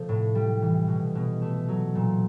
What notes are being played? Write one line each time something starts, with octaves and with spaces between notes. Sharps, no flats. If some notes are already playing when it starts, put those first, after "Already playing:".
Already playing: C3 F3 A3
A2
G3
E3
B2
B2
A3
F#3
A#2